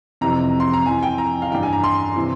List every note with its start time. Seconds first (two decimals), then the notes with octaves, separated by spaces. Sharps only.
0.21 F2 C3 E3 A#5
0.60 C6
0.74 A#5
0.86 F2 E3 G#5
1.03 G5
1.18 A#5
1.42 F5
1.51 G2 E3 G5
1.63 G#5
1.73 A#5
1.84 C6
2.16 C3 E3